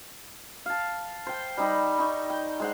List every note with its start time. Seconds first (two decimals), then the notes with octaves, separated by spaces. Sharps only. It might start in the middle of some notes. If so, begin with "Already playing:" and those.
0.66 F5 A5
1.27 C5 G5
1.57 G3 D#4 B5
1.99 D#4 C#6
2.30 G5
2.60 G#3 C5 F#5